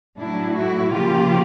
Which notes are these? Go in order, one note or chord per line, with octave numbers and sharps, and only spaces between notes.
A2 F#3 A3 D4 E4
E4 F#4
C#3 F3 A#3 F4 G4